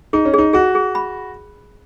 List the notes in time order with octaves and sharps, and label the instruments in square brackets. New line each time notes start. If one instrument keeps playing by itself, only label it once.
[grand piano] D#4 [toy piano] G#4
[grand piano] C#4
[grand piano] D#4 [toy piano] G#4
[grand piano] F#4 [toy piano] G#4
[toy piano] G#4
B5